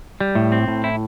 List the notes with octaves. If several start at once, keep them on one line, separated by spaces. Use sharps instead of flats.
G3
A2
C4
A2
E4